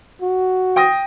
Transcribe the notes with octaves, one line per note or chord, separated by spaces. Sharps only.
F#4
G5 D#6 A#6